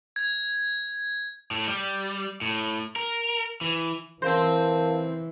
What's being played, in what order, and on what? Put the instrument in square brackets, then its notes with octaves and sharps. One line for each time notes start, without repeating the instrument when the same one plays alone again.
[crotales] G#6
[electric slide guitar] A2
G3
A2
A#4
E3
[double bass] E3 [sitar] C4 C5 [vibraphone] A#4 F5 A5